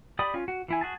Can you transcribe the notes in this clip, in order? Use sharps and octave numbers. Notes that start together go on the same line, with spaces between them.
G4 D5 B5 D#6
C#4 F4
F#4
E3 E4 G#5
F#4 G#4 A5